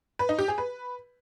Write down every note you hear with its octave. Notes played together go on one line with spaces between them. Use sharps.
B4
D#4
G4
G#4
B4